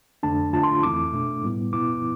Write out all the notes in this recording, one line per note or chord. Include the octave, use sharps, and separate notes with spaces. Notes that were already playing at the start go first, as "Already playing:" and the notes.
F2 D3 A3 D4 A5
E2 D3 A3 D4 F4 A5
C6
F2 E3 A3 C4 E4 D6
B2 A3 D4
A2 G3 B3 E4
E2 B2 B3 E4 D6